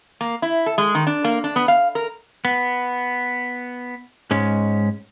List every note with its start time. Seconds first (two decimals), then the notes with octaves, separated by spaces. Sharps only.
0.21 A#3
0.42 E4
0.66 A4
0.78 G#3
0.95 D#3
1.07 D4
1.24 A#3
1.44 D4
1.56 B3
1.68 F5
1.95 A#4
2.45 B3
4.31 G#2 G#3 C#4